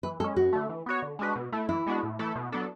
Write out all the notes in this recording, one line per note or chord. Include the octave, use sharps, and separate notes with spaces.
E3 B4
G#3 C#4 A4
F#2 F#4
D3 A3
E3
B3 F#4 C#5
D3
G#3 D4 F#4 B4
B2
A3 E4
E3 E4
G#3 B3 D4 F#4
A2
E3 A3 E4 A4
B2
F#3 B3 D4 A4